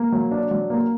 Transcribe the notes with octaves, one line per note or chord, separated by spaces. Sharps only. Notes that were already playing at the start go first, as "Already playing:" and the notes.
Already playing: A#3
F#3
D4
F#3
A#3